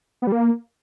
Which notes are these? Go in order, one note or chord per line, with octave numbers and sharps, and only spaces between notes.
B3
G3
A#3